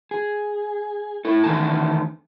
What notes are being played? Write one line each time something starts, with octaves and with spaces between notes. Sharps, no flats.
G#4
E4 A4
E2 D3 D#3 A3 G#5 A5